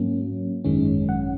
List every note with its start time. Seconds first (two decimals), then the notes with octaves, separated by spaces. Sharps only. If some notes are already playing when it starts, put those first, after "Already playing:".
Already playing: G#2 F#3 A#3 C#4
0.64 G#1 F#2 D#3 G#3 C#4
1.09 F#5